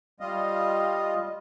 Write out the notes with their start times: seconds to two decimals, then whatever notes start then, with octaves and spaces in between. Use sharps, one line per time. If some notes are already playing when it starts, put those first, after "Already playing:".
0.20 G3 F4 D#5